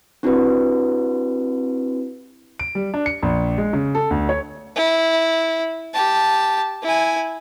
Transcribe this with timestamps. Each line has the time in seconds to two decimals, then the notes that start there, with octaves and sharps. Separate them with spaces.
0.23 C4 D4 E4 F#4 G4 B4
2.59 D7
2.75 G3
2.94 D4
3.06 C#7
3.23 A#1
3.58 G#3
3.73 C#3
3.95 A4
4.11 D2
4.29 C#5
4.76 E4
5.94 G4 A5
6.83 E4 G#5